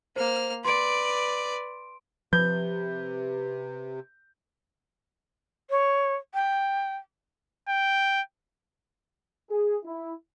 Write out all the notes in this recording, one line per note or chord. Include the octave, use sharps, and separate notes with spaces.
A#3 C5 F6
B4 D5 C6 D7
C3 F3 B4 G6
C#5
G5
G5
G#4
E4